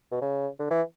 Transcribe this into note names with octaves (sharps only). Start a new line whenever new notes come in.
B2
C#3
D3
E3